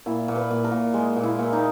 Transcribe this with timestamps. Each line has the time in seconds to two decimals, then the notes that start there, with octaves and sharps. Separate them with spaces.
0.06 A#2 E4
0.28 A#2
0.36 B4
0.50 A#2
0.64 A#4
0.72 A#2
0.94 G#3
1.16 A#2
1.24 E4
1.38 A#2
1.53 D#4